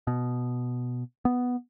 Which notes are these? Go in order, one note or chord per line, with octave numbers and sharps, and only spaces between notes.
B2
B3